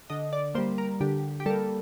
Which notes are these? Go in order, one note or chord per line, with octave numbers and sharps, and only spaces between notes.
D3 D#5
D5
G3 A#3 C5
A#4
D3 G4
G4
G3 A#3 A4